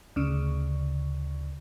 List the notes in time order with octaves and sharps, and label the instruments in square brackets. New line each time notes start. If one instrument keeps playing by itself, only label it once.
[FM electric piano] D2 C#3